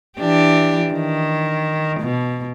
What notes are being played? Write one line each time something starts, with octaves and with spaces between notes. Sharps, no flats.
E3 D4 G4
D#3
B2